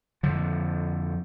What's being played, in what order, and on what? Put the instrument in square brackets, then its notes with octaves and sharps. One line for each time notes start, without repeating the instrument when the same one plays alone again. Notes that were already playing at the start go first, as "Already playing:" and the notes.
[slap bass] F2 D3 F3